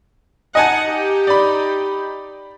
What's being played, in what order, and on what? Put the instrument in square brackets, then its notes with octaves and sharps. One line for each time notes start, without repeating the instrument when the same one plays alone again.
[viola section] D#4 F#5 [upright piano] D#5 G#5 A5
[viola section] D#4 G4
[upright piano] D5 B5